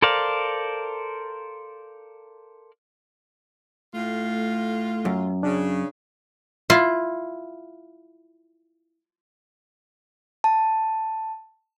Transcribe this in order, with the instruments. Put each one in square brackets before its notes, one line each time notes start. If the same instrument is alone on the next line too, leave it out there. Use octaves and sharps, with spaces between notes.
[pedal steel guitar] A4 A#4 C5 D5 F5
[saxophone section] A2 F4 [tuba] A3
[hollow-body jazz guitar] F#2
[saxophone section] C#3 [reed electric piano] D4
[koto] E4 F4
[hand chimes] A5